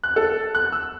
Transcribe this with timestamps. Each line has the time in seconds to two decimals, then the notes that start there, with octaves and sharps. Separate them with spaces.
0.04 F#6
0.16 A4
0.55 F#6
0.72 E6